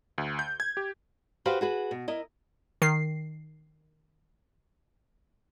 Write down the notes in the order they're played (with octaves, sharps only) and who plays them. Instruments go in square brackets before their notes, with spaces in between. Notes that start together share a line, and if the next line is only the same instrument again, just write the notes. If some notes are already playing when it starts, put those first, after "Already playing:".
[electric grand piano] D2
G6
G#6
G4
[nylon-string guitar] F#4 G4 B4 C5 F5
F#4 G#4 B4
B2
E4 A#4 D#5
[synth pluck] D#3 C7